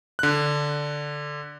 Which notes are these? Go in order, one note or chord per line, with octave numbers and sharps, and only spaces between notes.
D3 F#6